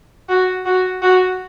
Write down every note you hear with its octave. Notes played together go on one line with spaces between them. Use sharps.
F#4
F#4
F#4